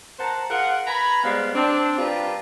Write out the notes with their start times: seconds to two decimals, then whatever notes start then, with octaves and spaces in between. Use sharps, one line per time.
0.19 A#4 C5 F#5 A5 A#5
0.49 F4 G#4 A#4 F#5
0.87 B4 G#5 A#5 B5
1.23 G3 G#3 B3 C5 F5
1.55 C4 D4
1.98 G3 D4 F4 G4 A#4 B4